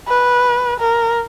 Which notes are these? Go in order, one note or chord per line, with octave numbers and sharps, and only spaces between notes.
B4
A#4